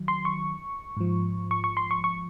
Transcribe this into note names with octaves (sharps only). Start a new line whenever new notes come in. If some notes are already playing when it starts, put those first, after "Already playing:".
Already playing: D#3 F#3
C6
C#6
G#2 F3
C#6
C#6
C6
C#6
C#6